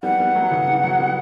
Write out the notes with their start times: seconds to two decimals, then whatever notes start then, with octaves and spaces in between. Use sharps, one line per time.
0.03 G3 B3 F#5
0.20 G3 B3
0.35 F#3 A3
0.51 C#3 E3
0.67 E3 G3
0.84 F#3 A3
0.99 G3 B3